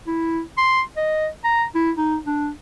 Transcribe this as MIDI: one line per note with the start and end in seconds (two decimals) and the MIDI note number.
0.07 0.40 64
0.57 0.82 84
0.97 1.28 75
1.44 1.65 82
1.75 1.91 64
1.97 2.17 63
2.26 2.50 62